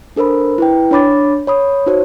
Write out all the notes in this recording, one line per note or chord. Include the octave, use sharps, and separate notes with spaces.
D4 A4 A#4 C5 B5
E4 B4 G5
D4 C#5 B5 D6 A6
C#5 B5 D#6
D#4 F#4 C5 C#5